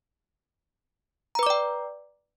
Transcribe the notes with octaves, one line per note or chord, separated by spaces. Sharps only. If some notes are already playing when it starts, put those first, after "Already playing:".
B4 D5 G5 A#5 D6